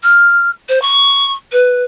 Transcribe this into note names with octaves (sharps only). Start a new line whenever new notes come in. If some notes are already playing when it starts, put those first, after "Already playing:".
F6
C5
C#6
B4